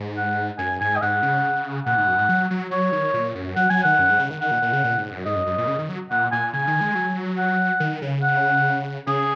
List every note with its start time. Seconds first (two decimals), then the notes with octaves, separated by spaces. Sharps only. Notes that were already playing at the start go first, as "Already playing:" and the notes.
Already playing: G#2
0.16 F#5
0.59 F#2 G#5
0.81 G#2 G#5
0.96 D#5
1.02 G#2 F#5
1.23 C#3
1.86 A#2 F#5
1.97 G#2
2.07 F#2
2.18 G#2
2.29 F#3
2.50 F#3
2.71 F#3 C#5
2.92 D#3
3.14 A#2
3.35 F#2
3.56 F#3 F#5
3.70 F#3 G#5
3.83 D#3 F#5
3.99 F#2
4.09 G#2
4.19 C#3
4.30 D#3
4.41 D#3 F#5
4.51 A#2
4.62 A#2
4.73 C#3
4.84 A#2
4.98 G#2
5.11 F#2
5.26 G#2 D#5
5.36 F#2
5.46 F#2
5.58 A#2
5.67 C#3
5.79 D#3
5.89 F#3
6.11 A#2 F#5
6.31 A#2 G#5
6.53 C#3 G#5
6.67 D#3
6.81 G#3
6.95 F#3
7.37 F#5
7.80 D#3
8.02 C#3
8.22 F#5
9.07 C#3 G#4